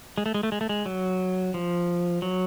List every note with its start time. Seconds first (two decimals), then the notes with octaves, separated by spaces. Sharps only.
0.18 G#3
0.26 A3
0.34 G#3
0.43 A3
0.52 G#3
0.61 A3
0.69 G#3
0.86 F#3
1.54 F3
2.22 F#3